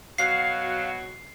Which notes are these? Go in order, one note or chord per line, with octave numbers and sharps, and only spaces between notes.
B2 F#3 F#4 F5 C7